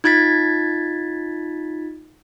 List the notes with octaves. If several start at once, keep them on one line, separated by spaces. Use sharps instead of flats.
D#4 F4 G#6 A6 B6